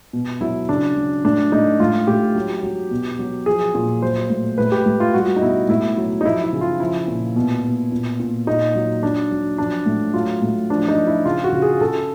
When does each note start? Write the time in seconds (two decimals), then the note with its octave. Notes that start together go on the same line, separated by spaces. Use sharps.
0.13 B2
0.41 F#3 E4
0.69 C#3 D4
0.96 F#3
1.25 A2 D4
1.52 A2 D#4
1.80 A2 F4
2.07 A2 G4
2.35 F#3
2.63 F#3
2.91 B2
3.19 F#3
3.46 F3 G#4
3.75 A#2
4.02 F#3 C5
4.30 A2
4.58 A2 B4
4.72 G4
4.86 A2
5.00 F4
5.14 G3 F#4
5.36 D#4
5.42 B2 E4
5.69 A2 E4
5.98 F#3
6.21 D#4
6.24 F3 E4
6.44 E4
6.53 C#3
6.61 F4
6.80 F3 E4
7.08 A#2
7.36 B2
7.64 B2
7.92 A#2
8.20 A#2
8.47 A#2 D#4
8.75 F#3
9.03 F#3 D4
9.31 F#3
9.58 F3 D4
9.86 A2
10.14 F#3 F4
10.42 A2
10.70 F3 D4
10.88 D#4
10.97 F3
11.07 E4
11.26 C#3 F4
11.44 F#4
11.52 C#3
11.62 G#4
11.81 C#3 A4